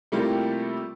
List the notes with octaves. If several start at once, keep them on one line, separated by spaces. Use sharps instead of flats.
C3 G3 A3 A#3 E4 F4